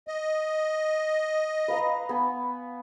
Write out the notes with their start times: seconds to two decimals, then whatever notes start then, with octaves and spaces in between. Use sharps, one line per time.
0.08 D#5
1.68 B4 F5 A#5
2.09 B3 G#5 B5